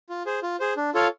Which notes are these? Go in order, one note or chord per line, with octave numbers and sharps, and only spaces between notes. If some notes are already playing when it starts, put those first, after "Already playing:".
F4
G#4 C5
F4
G#4 C5
D4
F4 A4 C#5 F5